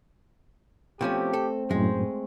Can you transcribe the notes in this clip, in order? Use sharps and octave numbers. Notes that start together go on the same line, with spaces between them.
B2 F3 A3 C4 C#4 G4
A4
F#2 A2 G#3 C5